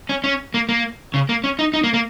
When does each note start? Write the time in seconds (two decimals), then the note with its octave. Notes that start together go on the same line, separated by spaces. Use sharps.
0.09 C#4
0.24 C#4
0.54 A#3
0.69 A#3
1.14 C#3
1.29 A#3
1.44 C#4
1.59 D#4
1.73 D#4
1.84 A#3
1.94 A#3